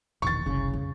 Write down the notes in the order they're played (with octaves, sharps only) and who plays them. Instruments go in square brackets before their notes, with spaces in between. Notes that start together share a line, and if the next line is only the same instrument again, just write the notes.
[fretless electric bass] E1 A#1 D#3 [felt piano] C#6 A6
[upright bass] F#1 C2 [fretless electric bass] C#3
[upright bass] F2 B2